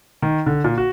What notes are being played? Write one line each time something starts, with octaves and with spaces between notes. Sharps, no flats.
D#3
D3
A#2
F#4